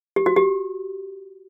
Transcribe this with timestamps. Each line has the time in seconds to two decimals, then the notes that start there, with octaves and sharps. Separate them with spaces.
0.16 G4
0.26 F#4
0.36 G4